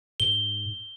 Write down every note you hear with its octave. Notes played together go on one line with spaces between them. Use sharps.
G#2 G7